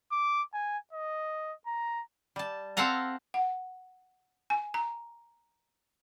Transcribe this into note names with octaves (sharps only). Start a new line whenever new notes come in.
D6
G#5
D#5
A#5
G3 A5
C4 A4 F5 F#5 A5 A#5
F#5
G#5
A#5